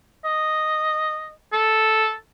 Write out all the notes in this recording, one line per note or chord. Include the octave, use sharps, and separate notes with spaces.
D#5
A4